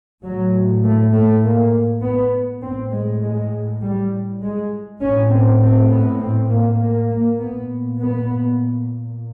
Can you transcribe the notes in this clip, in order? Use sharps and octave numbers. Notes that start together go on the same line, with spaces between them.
A2 F#3
A3
A3
A#3
B3
A2 C4
G#3
G#3
G3
G#3
A2 C#4
C4
C4
B3
C4
A#3
A#3
A#3
A#2 B3
B3